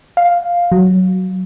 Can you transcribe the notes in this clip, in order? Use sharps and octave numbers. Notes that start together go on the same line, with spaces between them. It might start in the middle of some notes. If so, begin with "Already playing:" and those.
F5
F#3